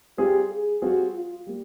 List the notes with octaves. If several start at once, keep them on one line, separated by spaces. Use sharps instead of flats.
G3 C4 F4 G4 G#4
G#4
G3 C4 F4 F#4 G#4
F4
G3 A#3